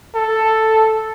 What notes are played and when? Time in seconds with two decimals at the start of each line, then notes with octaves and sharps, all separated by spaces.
0.15 A4